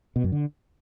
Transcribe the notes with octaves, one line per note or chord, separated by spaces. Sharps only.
B2
F#2
D3